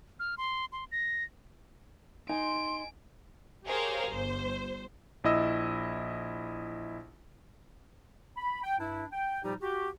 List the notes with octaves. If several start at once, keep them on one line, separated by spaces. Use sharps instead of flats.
F6
C6
C6
A#6
D#4 G#5 C6 D7
G4 G#4 A#4 C5 C#5 F5
G1 C5
A#1 E4 D#5 E6
B5
G5
G2 D4 E4
G5
A#2 F3 G3 D#4 G4
F#4 G4